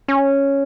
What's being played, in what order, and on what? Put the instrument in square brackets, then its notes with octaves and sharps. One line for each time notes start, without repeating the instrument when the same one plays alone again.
[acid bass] C#4